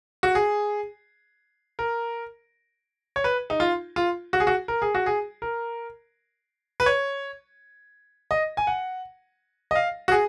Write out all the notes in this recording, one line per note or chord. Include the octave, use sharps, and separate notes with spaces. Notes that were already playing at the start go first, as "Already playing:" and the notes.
F#4
G#4
A#4
C#5
B4
D#4
F4
F4
F#4
G#4
F#4
A#4
G#4
F#4
G#4
A#4
B4
C#5
D#5
G#5
F#5
D#5
F5
F#4
G#4